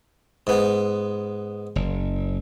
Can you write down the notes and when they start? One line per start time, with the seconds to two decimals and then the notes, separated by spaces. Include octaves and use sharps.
0.47 G#2 B3
1.76 F#1